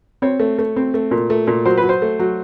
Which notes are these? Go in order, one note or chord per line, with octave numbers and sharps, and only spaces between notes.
C4 C#5
A3
A3
C4
A3
A#2
A3
A#2
F#3 C5
B4
F#3
C5
A3
F#3